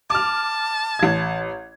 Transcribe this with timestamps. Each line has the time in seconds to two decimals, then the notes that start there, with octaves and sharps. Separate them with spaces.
0.10 A5 D6 F6
0.99 A1 G#6